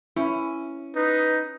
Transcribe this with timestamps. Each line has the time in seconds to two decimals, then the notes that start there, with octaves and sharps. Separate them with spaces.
0.17 C#4 E4
0.96 D#4 B4